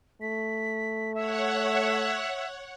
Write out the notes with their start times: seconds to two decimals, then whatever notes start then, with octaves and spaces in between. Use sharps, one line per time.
0.22 A3 B6
1.15 C#5 E5 F#5